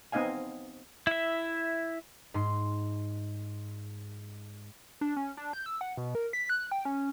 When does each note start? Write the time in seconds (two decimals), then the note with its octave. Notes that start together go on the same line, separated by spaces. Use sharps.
0.12 B3 C4 D#4 D#5 F5 G#5
1.07 E4 E5
2.34 G#2 C6
5.01 D4
5.16 C#4
5.37 D4
5.53 G6
5.66 E6
5.81 F#5
5.97 B2
6.15 A#4
6.33 B6
6.49 F#6
6.72 G5
6.85 C#4